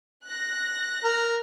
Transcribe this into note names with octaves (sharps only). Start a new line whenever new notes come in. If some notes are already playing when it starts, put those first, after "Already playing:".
F#6 A#6
A#4